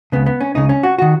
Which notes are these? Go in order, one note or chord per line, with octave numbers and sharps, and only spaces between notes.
C#2 C#3 B3
B3
C#4
C#2 C#3 D#4
C#4
F#4
D#3 F#4